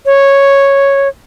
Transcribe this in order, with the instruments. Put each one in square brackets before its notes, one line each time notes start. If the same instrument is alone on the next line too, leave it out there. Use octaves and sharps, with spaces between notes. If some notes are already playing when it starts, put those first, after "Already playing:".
[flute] C#5